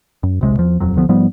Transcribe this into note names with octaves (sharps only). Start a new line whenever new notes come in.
F#2
D#1 B1 C3 G#3
E2 F3
D#1 F2 F#3
C2 D3 F3 B3
G#2 F3 G3 B3